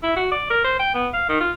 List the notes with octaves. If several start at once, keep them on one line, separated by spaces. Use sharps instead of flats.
E4
F#4
D5
A#4
C5
G5
B3
F5
D#3
F4